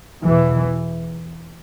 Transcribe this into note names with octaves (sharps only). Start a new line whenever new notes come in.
E2 B2 E3